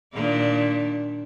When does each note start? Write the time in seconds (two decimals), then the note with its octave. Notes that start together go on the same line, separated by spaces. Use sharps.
0.13 A#2 D#3 D4